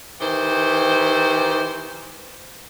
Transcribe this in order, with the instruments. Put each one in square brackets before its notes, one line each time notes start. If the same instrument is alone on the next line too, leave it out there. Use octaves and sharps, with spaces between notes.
[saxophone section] D#3 E3 G4 C5